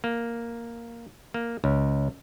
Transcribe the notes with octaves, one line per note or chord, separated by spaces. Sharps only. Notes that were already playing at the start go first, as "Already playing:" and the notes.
A#3
A#3
C#2